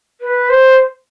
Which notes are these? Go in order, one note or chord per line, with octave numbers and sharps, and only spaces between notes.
B4
C5